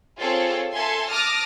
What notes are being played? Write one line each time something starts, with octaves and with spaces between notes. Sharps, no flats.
C4 F4 G#4 A4 C#5
A4 E5 G#5 C6
A5 D6 D#6 F6 A#6